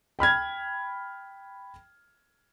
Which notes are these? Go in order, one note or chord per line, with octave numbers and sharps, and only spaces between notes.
G5 B5 F6 G#6